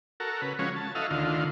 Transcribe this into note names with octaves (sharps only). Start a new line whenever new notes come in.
F#4 A4 A#4
C#3 B4
C#3 F3 G#3 C#4 F#4
A5
E4 F#4 A4 D#5 F5
D2 D3 D#3 F4